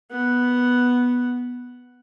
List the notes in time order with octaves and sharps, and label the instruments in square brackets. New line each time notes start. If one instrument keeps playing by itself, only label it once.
[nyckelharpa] B3 F#5